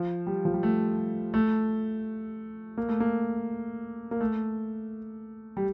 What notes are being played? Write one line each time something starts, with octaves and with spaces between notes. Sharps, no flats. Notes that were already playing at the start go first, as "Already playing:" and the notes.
Already playing: F3
G3
F3
G3
A3
A3
A#3
A3
A#3
A#3
A3
G3